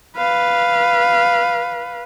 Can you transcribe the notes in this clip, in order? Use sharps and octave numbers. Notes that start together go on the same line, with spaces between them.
B4 F5